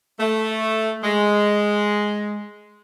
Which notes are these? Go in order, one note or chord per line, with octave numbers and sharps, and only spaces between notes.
A3
G#3